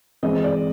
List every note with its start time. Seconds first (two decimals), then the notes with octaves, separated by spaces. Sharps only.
0.23 E3 G#3 C4 D#5
0.44 D5